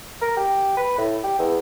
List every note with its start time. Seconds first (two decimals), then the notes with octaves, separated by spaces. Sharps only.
0.21 A#4
0.37 G4
0.77 B4
0.98 A2
1.23 G4
1.38 E2